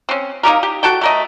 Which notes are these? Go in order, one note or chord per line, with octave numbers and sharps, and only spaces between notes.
C4 C#4
A#3 D#4 G4 A#4
G4
F#4 A4 G5
A3 A#4 D#5